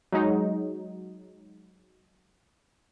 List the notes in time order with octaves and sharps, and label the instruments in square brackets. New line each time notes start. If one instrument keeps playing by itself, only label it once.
[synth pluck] F#3 G#3 D#4